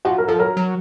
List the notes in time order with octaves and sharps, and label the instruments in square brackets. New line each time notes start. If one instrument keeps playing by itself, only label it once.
[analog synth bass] F3 [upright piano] F#4
[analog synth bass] F#3 [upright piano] A#4
[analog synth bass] F3 [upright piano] A4
[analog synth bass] F#3 [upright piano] A#4
[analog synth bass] F#3